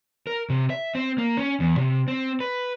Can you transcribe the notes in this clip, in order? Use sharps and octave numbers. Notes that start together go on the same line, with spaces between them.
A#4
C3
E5
C4
A#3
C#4
E2
C3
C4
B4